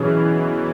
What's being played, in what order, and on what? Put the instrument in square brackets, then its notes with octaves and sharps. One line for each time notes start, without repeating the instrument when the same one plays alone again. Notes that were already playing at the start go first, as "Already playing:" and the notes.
Already playing: [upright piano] B2 F#3 C#4 G#4 [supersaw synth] E3